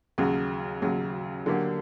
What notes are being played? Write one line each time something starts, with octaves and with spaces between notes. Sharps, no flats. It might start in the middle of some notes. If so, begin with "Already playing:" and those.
D#2 C#3 F#3
D#2 C#3 F#3
D3 F#3 A#3 D4 G4